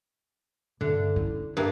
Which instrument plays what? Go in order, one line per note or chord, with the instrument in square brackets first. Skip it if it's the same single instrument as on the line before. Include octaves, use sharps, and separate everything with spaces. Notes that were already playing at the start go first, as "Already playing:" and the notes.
[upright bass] G2 [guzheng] D3
[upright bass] C#4 E4
[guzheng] G2 A#3